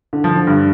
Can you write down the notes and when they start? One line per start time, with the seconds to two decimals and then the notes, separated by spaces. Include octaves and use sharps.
0.13 D3
0.24 F3
0.35 D3
0.47 G2